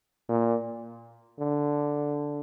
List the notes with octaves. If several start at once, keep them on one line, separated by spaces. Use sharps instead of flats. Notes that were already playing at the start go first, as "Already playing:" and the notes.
A#2
D3